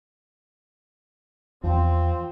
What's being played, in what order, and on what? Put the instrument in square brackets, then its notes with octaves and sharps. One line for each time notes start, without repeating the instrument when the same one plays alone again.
[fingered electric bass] E2 [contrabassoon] F3 [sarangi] C4